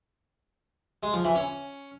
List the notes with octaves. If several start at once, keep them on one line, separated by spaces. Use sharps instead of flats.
G#3
F3
E3
C#4